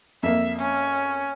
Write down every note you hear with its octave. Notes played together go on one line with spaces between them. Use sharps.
F2 A#3 E5
C#4